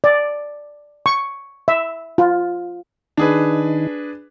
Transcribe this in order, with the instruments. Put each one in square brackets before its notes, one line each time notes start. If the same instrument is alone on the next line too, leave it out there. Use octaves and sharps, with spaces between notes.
[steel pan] D5
C#6
E5
F4
[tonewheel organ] D#3 D#4 [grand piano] D4 G#4 B4